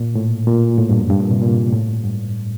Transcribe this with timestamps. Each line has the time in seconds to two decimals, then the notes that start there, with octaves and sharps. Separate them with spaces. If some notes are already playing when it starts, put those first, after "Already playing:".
Already playing: A#2
0.15 A2
0.47 A#2
0.78 A2
0.89 G2
0.99 F#2
1.10 G2
1.20 A#2
1.31 C3
1.42 A#2
1.72 A2
2.03 G2